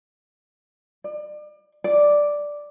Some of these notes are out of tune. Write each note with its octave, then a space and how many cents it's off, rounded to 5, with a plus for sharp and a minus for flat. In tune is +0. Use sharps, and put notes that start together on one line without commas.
D5 +35
D5 +0